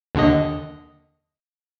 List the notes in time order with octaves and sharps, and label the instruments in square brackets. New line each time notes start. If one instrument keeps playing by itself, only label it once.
[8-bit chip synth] D#2 D3 D#5